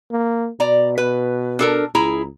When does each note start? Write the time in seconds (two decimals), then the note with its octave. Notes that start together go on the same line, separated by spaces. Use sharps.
0.11 A#3
0.60 B2 D5 A#5
0.98 B4
1.59 D4 A4 A#4
1.95 C#2 E4 G#4 A#5